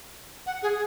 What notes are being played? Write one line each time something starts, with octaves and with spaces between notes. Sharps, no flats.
F#5
G#4